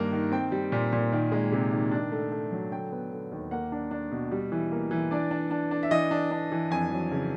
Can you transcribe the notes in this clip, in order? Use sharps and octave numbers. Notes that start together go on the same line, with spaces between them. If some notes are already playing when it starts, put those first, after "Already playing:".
Already playing: G2 D#3 A#3
D#3
C4 G5
G3
A#2
A#2
D#3
G#3
C3
D#3
D4
A3
A3
F#3
D3 G5
B3
D3
D#2
A#3 F#5
D4
D4
B2
G3
E3
A#3
E3
D4 D5
D4
D4
D4
E5
E3 D#5
D4
D4
E3
F2 G#5
F#3
C#3